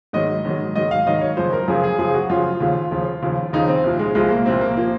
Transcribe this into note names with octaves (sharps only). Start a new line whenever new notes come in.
G#2 D#3 F#3 D#5
G#2 D#3 F#3
G#2 D#3 F#3 D#5
F5
G#2 D#3 F#3 D#5
C#5
F#2 C#3 F3 C5
A#4
F#2 C#3 F3 G#4
G#4
F#2 C#3 F3 G#4
F#4
F#2 C#3 F3 F4
D#2 C#3 F3
D#2 C#3 F3
D#2 C#3 F3
D#2 C#3 F3 D#4
C4
C2 A#2 F3
G#3
C2 A#2 F3 G#3
A#3
C2 A#2 F3 C4
A#3
A#2 F3 A#3